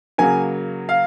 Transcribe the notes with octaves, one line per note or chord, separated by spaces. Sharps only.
C#3 F#3 A#3 G#5
F5